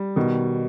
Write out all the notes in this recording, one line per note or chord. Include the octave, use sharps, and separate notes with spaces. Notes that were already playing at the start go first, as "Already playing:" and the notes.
Already playing: G3
B2 D#3